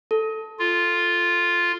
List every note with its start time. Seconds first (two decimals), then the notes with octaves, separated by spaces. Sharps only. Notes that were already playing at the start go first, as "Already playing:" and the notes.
0.11 A4
0.59 F4